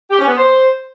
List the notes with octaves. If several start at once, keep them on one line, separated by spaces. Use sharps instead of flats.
G4
C#4
B3
C5